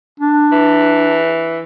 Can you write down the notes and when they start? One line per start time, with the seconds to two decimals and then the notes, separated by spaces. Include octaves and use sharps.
0.20 D4
0.52 E3